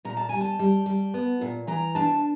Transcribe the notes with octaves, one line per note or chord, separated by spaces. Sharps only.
A#2 A#5
A5
G3 G#5
A5
G3
G3
B3
A#2
E3 A#5
D4 A5